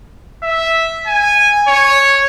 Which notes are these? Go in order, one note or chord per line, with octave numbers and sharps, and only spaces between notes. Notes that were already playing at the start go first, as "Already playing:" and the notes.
E5
G#5
C#5